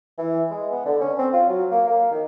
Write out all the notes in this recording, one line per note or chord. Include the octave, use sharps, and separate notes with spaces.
E3
G#3
B3
D3
C#4
C4
F4
F#3
A#3
A#3
D#3